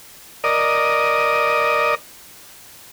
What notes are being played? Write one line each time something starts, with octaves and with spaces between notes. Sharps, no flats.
A#4 D5 D#5 D#6